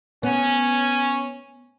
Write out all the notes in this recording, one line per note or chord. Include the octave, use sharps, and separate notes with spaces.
B3 C#4